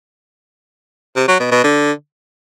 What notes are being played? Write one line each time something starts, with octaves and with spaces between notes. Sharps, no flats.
C3
F#3
B2
B2
D3